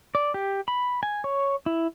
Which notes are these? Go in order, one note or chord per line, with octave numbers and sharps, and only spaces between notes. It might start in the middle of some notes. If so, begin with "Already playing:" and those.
D5
G4
B5
G#5
C#5
E4